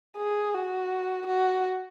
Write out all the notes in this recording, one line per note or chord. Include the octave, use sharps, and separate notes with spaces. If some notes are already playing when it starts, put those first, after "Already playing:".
G#4
F#4
F#4